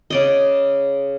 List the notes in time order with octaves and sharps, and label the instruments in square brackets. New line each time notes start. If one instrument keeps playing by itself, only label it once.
[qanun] C#3 D5 D#5